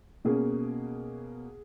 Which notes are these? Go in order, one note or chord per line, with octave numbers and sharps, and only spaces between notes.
B2 A#3 C#4 G#4